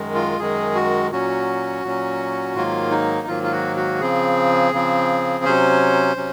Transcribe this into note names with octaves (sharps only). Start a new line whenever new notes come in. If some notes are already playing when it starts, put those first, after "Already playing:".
Already playing: F#2 D#3 G#3
F4
F#2 D#3 G#3 G#4
F#4
A#2 F#3 C#4 F#4
A#2 F#3 C#4
G#2 D#3 F#3 A#3 F4
D#4
G#2 D#3 F#3 A#3 F4
F4
F#4
F#4
C#3 F3 C4 G#4
C#3 F3 C4
C3 F#3 C#4 C5
C3 F#3 C#4